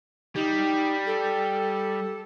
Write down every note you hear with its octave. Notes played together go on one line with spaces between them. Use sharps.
G3 D#4
A4